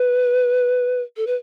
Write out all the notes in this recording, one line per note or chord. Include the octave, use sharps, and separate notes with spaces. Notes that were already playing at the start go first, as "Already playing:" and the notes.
Already playing: B4
A4
B4